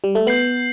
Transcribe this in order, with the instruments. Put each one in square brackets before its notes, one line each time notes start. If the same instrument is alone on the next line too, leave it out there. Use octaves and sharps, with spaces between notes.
[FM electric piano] G3
A3
[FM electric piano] B3 [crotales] G6 C7 F#7